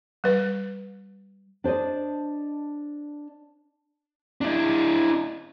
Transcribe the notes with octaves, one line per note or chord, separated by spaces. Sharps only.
G3 B4
D4 C5 D5 D#5
D4 E4